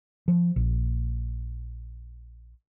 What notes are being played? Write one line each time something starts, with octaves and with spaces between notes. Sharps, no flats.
F3
A#1